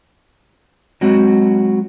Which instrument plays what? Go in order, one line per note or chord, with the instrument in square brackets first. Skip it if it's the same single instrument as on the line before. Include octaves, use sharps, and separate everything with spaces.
[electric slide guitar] F#3 G#3 C4 F#4